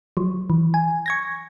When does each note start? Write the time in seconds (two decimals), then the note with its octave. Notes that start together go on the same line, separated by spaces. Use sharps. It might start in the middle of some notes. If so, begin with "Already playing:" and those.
0.17 F3 F#3
0.50 E3
0.74 G#5
1.06 C#6 G#6 A#6